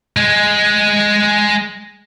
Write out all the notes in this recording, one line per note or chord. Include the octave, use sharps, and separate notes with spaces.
G#3 G#4